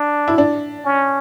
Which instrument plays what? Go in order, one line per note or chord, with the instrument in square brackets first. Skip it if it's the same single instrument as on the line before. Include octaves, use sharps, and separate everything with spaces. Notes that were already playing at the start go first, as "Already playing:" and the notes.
Already playing: [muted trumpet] D4
[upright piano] E4
D4
[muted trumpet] C#4